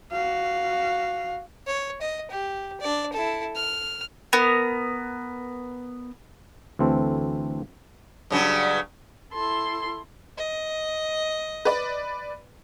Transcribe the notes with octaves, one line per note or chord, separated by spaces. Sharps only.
F#4 F5
C#5
D#5
G4
D4 D5
E4 A4
F6
B3 A#4
D2 E3 C4 A4
G2 C#3 F#3
E4 A4 C6
D#5
B4 D5